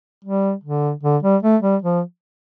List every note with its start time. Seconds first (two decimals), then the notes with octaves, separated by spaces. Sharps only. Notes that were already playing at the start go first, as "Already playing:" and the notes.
0.25 G3
0.64 D3
1.03 D3
1.23 G3
1.43 A3
1.62 G3
1.82 F3